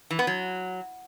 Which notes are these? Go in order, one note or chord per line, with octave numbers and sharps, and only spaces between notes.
E3
B3
F#3